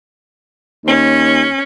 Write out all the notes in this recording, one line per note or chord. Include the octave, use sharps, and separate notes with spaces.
D#2 C#4